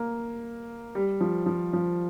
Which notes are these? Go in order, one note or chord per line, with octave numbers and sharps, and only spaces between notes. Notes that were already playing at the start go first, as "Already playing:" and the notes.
Already playing: A#3
G3
F3
F3
F3